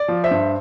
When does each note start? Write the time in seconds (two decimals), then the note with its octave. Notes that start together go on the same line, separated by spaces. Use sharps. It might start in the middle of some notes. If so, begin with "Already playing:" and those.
Already playing: D5
0.08 F3
0.24 C5 E5
0.31 G2